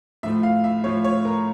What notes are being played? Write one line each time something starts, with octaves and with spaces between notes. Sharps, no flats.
A2 F3 A3 E5
F5
E5
A2 F3 A3 C#5
C#5
A#4